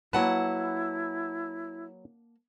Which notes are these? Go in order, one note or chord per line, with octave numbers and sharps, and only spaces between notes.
F#3 A#3 E4 B4 F#5 A5